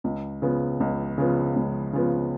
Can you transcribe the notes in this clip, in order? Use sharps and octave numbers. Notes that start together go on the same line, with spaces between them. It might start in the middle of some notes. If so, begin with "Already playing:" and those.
C#2
C#3 F3 B3
C#2
C#3 F3 B3
C#2
C#3 F3 B3